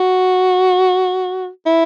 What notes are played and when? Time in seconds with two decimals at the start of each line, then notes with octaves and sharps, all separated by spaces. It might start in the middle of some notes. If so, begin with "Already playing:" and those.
Already playing: F#4
1.66 E4